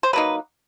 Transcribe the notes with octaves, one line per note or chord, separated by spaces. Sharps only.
C5
F#3 A#3 D#4 B4